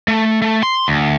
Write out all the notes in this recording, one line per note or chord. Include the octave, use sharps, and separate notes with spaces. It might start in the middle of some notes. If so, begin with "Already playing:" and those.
A3
A3
C6
D2